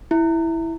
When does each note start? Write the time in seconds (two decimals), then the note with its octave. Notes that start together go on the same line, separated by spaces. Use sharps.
0.11 E4